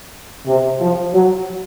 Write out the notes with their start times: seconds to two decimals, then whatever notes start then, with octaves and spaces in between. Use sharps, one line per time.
0.47 C3
0.80 F3
1.13 F#3